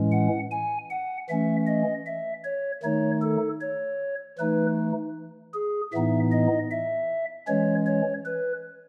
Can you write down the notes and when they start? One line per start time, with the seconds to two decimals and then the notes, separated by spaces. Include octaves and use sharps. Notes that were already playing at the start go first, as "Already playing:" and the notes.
Already playing: A2 E3 G#3 C#4
0.12 F#5
0.51 G#5
0.90 F#5
1.29 E3 A3 C#4 E5
1.67 D#5
2.06 E5
2.45 C#5
2.83 D#3 A3 D#4 C#5
3.22 A4
3.61 C#5
4.38 E3 A3 D#4 B4
5.54 G#4
5.92 A2 E3 B3 D#4 E5
6.32 D#5
6.71 E5
7.48 E3 G#3 C#4 C#5
7.87 C#5
8.25 B4